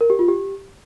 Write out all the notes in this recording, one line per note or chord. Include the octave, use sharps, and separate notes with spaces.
A#4
G4
F4
G4